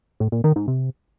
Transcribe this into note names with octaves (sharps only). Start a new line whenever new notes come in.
A2
A#2
D#3
G#2
C3